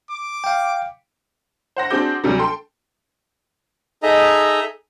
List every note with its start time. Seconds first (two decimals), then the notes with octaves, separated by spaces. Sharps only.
0.11 D6
0.44 F5 G5
1.76 C5 F#5 A#6
1.90 C4 D4 F#4 G#4 D6 G6
2.24 D2 C3 F#3 G3
2.38 A4 G5 C6
4.03 D#4 G#4 A4 D#5 E5 A#5